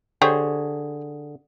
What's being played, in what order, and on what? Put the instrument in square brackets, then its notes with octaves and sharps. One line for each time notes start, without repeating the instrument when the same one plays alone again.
[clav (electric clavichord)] D3 G#4 [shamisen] G4 C5 C#5